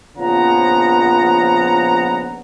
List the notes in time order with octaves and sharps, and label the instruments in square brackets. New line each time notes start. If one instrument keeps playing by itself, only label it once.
[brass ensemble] A#1 C#3 F3 B3 F#5 A#5